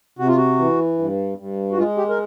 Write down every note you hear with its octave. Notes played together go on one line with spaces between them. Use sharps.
C3 F#4
F4
F#4
E3
G2
G2
F#4
G#3 F4
G4
A#4